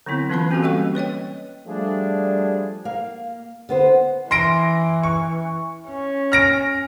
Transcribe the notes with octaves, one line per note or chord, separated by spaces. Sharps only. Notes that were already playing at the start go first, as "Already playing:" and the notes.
D3 F#3 B3 C4 E4
E3 A#3 C#4 F4 B4 B5
A#3 C4 C#4 F#4 G4 A4
G3 A#3 D#5 G5 C#6
B4 C#5 D#5 G5
F3 G3 A3 D4 G#4
A#3 F5
D3 B3 C5
E3 C6 A#6 D7
C#6
C#4
F6 A#6 D7